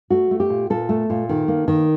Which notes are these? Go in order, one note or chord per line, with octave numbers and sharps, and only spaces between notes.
A3 F#4
A3
G4
A#2
A#2 A4
A3
A#2
D#3
A#3
D#3